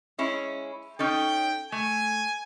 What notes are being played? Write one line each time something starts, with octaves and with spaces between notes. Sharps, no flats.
G#3 C#4 E4
C#4 D#4 A4 G5
A3 G#5